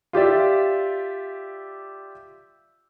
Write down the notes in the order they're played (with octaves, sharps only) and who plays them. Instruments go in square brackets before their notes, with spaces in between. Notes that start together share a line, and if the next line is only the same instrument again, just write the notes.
[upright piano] F4 G4 D5 E5